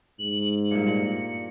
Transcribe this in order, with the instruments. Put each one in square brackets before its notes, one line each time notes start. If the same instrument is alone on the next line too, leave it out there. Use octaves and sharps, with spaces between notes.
[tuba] G#2 [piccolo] F#7
[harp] G2 A#2 [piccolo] C#7